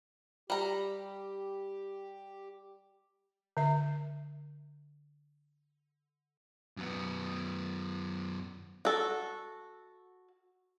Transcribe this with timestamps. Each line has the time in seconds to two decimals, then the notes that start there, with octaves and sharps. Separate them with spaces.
0.50 G3 G4 A#5
3.57 D3 E5
6.77 F#2 B3
8.85 F#4 A4